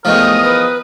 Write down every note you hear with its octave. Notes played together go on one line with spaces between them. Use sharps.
E2 D#3 F3 A3 A#4 D#6
B4